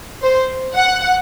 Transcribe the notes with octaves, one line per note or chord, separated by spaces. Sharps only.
C5
F#5